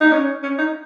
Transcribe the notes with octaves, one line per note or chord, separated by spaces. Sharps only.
D#4
C#4
C#4
D#4